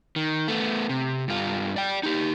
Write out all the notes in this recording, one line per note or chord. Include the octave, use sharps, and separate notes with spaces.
D#3
A3 B3
C3
G2 F4
D5 G5
D#4 G4